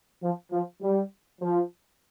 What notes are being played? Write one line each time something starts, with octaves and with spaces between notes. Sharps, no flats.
F3
F3
G3
F3